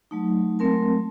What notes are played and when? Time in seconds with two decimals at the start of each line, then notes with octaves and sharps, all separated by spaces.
0.11 F#3 A3 D#4
0.59 F#3 G#3 A3 C4 A#4 A5